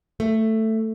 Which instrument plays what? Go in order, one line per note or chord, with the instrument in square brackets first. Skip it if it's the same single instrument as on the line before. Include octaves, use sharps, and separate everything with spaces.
[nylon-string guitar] A3